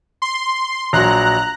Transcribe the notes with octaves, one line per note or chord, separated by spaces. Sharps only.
C6
A#1 F#3 A#5 F#6